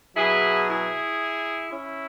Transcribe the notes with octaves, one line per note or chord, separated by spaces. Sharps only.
B2 F#3 E4 G#4
E4 G#4
C#4 E4